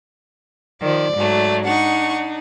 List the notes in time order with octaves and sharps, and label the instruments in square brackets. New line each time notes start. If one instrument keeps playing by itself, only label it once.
[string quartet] D#3 F3 [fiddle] D5
[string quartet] G#2 F#3 A3
[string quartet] D4 D#4 [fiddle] F#5 C#6